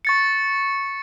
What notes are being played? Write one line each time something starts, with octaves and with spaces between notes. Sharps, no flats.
C#6 A6 C#7